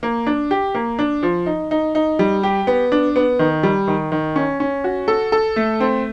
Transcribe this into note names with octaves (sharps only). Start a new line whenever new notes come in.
A#3
D4
G4
A#3
D4
F3
D#4
D#4
D#4
G3
G4
B3
D4
B3
D#3
G3
D#3
D#3
C#4
C#4
F#4
A4
A4
A3
C4